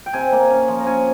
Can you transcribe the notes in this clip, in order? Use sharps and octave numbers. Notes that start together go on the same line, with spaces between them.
G5
C3 G#5
A#3
C#4
F3
A#5
C#4 G#5